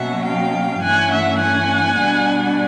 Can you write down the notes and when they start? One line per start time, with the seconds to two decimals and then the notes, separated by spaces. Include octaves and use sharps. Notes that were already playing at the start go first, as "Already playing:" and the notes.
Already playing: B2 F#3 A#3 C#4 E5 F#5
0.26 F5 G5
0.82 G2 E3 A3 C#4 F#5 G#5
1.11 E5 F#5
1.40 F#5 G#5
1.98 B2 G3 B3 D4